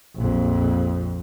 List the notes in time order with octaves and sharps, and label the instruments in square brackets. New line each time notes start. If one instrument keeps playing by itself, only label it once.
[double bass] A#1 F2